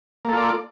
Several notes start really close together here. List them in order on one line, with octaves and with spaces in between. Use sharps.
A#3 A4 F4 D5